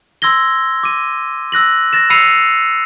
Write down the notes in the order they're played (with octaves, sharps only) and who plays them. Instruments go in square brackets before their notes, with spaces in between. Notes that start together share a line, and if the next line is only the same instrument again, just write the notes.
[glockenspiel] C6 E6 G#6 A#6 G7
D6 D#7
E6 F#6 A#6 F#7
F#6 A6 A#6 E7
B5 E6 C7 C#7 D#7 F7